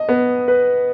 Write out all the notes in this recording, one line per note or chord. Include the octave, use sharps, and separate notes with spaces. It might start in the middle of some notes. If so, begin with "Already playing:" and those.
Already playing: D#5
B3
B4